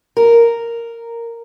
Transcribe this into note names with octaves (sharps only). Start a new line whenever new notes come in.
A#4